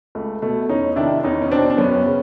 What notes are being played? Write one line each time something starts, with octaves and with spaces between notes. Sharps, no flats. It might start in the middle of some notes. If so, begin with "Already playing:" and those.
C#2 A3
B2 A3
E2 C#4 D#4
C3 D#3 D4 E4
E2 C#4 D#4
C#4
B2 C4 D4
D4
F#2 B3 C#4
C#3